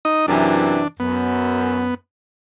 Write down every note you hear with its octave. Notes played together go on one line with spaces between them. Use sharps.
D#4 D#5
F#2 C3 E3 D4
F#2 B3